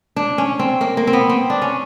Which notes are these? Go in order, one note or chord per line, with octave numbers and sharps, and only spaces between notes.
D4
C#4
C4
A#3
A#3
C4
B3
C4
D4
C#4